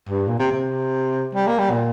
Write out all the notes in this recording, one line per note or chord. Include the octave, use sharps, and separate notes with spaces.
G2
A#2
C3
C3
G3
A#3
G3
A#2